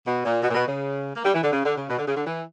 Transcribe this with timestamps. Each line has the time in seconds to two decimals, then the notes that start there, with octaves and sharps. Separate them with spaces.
0.06 B2
0.25 A#2
0.42 B2
0.50 A#2
0.55 B2
0.67 C#3
1.15 A#3
1.24 G3
1.34 E3
1.43 D3
1.52 C#3
1.64 D3
1.76 C#3
1.89 B2
1.98 D3
2.06 C#3
2.15 D3
2.26 E3